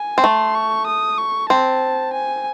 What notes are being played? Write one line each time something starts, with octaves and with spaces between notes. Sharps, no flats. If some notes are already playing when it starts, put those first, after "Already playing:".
Already playing: G#5
C4
A3 C6
C#6
D#6
C#6
C4 A5
G#5